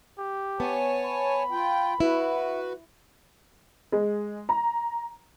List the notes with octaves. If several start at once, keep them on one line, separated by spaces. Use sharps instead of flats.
G4
B3 C#5 G#5 A5
B5
F4 G5
E4 F#4 B4
G#3
A#5